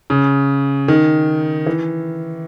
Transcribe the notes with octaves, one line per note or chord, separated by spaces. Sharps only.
C#3
D#3
E3